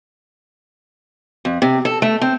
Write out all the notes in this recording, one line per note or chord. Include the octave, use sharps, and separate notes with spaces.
F2
C3
A4
A3
C4